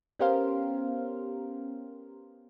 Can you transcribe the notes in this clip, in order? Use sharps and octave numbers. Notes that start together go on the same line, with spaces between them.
B3 C#4 G4 A#4 C5 F5